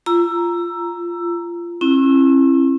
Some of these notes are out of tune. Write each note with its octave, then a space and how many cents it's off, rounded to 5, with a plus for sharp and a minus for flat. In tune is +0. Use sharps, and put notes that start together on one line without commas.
F4 -20 A#5 +0 E6 +15
C#4 -45 E4 +20